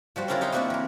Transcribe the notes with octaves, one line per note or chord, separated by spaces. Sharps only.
F3 G3 F#4 C5
C#4 D4 E4 F4 A#4 D5
G3 D#4 G5 A#5 C6
A3 A#3 C4 D4 E4 F#4
E3 A#4